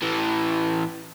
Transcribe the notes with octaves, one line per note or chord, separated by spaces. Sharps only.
A2 E3